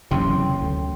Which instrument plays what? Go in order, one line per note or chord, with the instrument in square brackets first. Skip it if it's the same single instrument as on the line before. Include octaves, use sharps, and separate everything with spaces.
[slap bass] F#1 E2 C3 [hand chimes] C#4 G5 C6
[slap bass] D2